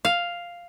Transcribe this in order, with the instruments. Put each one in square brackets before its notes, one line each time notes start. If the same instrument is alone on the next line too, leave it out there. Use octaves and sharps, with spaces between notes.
[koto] F5